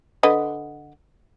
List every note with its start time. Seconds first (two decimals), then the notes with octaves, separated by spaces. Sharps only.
0.23 D3 B4 D#5